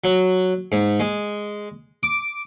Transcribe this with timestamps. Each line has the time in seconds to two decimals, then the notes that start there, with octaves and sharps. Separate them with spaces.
0.04 F#3
0.72 G#2
1.00 G#3
2.03 D6